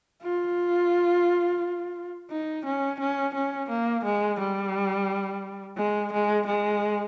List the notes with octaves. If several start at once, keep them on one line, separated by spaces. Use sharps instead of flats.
F4
D#4
C#4
C#4
C#4
A#3
G#3
G3
G#3
G#3
G#3